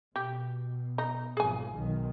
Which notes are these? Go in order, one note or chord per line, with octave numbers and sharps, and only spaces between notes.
B2 G4
D#4
G#1 B2 F3 G#4 G#5
B1 D#3 F#3